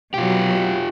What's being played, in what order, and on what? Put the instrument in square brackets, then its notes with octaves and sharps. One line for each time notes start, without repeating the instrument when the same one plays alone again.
[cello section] B2 F#3 [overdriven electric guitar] F4 G4